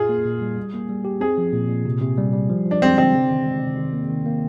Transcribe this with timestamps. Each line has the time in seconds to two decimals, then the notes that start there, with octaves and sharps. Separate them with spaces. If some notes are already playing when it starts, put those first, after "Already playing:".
Already playing: A#2 F4 G#4
0.09 A#3
0.25 A#2
0.41 G3
0.57 G3
0.74 A#3
0.89 G3
1.05 G4
1.21 C4 G#4
1.38 F3
1.53 A#2
1.69 A#2
1.85 C3
2.01 C3
2.18 G3
2.33 G3
2.49 F3
2.66 F3
2.71 D4
2.82 G#3 C4
2.97 D3 C4
3.14 C3
3.30 D#3
3.46 G#3
3.62 C3
3.77 D#3
3.93 A#3
4.10 D#3
4.26 A#3